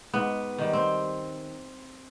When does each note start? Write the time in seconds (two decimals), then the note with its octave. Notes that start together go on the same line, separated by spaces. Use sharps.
0.13 G#2 B3
0.58 D#3 G3
0.73 C4